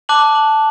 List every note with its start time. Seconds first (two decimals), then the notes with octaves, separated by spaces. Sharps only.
0.09 A5 D6 F#6 F#7
0.35 F#7